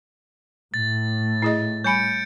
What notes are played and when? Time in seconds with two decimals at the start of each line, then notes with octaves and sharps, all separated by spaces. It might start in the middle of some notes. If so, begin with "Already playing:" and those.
0.74 A2 A6
1.42 E4 G#4 D#5
1.84 G3 G#5 B5 G6 C#7 D7